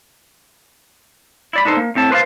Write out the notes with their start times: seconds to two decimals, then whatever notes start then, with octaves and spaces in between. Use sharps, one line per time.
1.53 E4 D5 B5
1.65 D4 D#4 A4 C5
1.77 A#3
1.95 A2 C4 E5 A5
2.11 B4 C5 D5 F5 A5